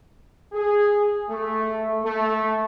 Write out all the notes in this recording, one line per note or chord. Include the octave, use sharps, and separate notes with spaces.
G#4
A3
A3